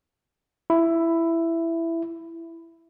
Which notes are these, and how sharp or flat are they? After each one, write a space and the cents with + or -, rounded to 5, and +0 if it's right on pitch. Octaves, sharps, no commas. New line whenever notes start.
E4 +10